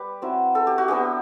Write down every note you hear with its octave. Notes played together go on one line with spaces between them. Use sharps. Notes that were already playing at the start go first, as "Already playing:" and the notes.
Already playing: G3 G4 B4
F#3 C4 E4
A4
G4
F#4
F#3 B3 D4 G4